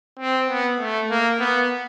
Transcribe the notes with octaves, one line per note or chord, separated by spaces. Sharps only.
C4
B3
A3
A#3
B3